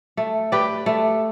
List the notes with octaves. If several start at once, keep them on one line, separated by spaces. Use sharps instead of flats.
A3
G4 B4 D5
A3